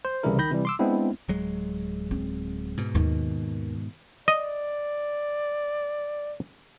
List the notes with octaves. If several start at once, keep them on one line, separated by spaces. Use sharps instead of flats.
C5
C2 C#3 E3 G3 E4 A#4
D#3 B5 G6 A#6
C3 E3 G3
C6 D6 E6
G#3 B3 C4 D4 E4
D1 F#3 G#3
C4
G#2 B2
D#2 D#3
D5 D#5